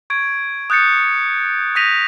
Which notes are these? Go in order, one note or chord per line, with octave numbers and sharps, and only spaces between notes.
C#6 G#6 D7
D#6 F#6 G6 A6 C#7
D#6 G6 A#6 B6 D#7 F7